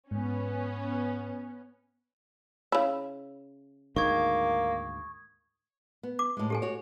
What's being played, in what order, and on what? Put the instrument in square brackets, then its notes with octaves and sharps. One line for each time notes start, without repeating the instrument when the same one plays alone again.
[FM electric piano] G#2 [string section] B3 C#4
[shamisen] C#3 E4
[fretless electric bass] D2 G#2 D#3 [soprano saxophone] A#3 [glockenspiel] C#6 D#6 G#6
[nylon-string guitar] B3
[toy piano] D6
[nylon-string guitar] A2 G#3
[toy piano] G4 A4 G#5
[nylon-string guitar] F#4 C#5